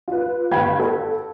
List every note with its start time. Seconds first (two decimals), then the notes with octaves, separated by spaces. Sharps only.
0.08 F4 B4
0.51 G1 F5 G5 B5 G#6
0.80 A4